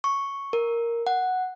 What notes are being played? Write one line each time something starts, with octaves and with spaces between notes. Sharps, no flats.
C#6
A#4
F#5